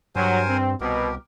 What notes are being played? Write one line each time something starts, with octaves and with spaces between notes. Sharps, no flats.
G2 F#3 A#4 C5 G#5
C4
C2 B2 G4 A#4